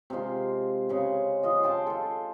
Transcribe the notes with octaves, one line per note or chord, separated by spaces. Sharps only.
C3 G#3 F4 C6
C#3 G#3
F4 D#5
G5 A5 C6
F4 A4